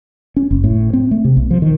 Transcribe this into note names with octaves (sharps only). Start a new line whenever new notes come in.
C#4
F#1
A2
C4
A3
C3
B1
F3
D#3